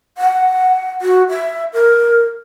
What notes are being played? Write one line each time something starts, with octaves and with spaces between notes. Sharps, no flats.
F#5
F#4
E5
A#4